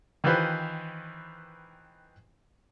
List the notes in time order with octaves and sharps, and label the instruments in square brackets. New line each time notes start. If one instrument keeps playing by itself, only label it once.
[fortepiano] D#3 E3 F4 G4 B4 C5